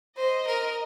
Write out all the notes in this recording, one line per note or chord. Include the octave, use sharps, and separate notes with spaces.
C5 D#5
A#4